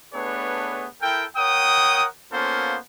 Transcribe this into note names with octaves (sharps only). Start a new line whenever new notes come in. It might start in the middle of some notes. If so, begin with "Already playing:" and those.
A3 B3 D4 G#4 B4 C#5
E4 A4 A#4 G5
A#4 C#5 F#5 G5 D#6
A#3 B3 C#4 F4 A4 C5